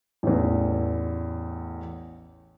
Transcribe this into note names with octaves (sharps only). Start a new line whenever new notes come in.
A1 E2